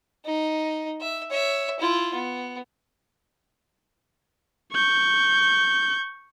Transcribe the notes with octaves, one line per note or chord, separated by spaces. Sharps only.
D#4
E5
C#5 E5
E4 F4
B3
C#6 G6